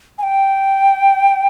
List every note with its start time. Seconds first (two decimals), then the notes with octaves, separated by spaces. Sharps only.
0.18 G#5
0.23 G5